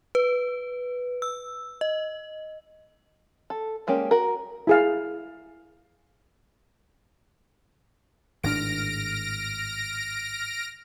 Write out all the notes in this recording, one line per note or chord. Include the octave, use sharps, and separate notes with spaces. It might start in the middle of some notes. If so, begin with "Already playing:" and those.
B4
E6
D#5
A4
G3 G#3 A#3 C#4 G4
F#4 A#4
E4 G#4 F5
G#1 A2 D4 F6 A#6 D7